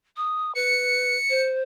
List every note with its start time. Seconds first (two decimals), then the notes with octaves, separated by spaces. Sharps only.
0.17 D#6
0.55 B4 C#7
1.29 C5